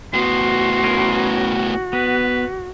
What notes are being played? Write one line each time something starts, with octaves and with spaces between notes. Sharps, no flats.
A2 B3 F#4 C6
C#4 A#4 B4
B3 B4